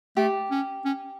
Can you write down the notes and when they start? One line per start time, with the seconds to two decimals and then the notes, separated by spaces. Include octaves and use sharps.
0.17 A3 G4
0.51 C#4
0.85 C#4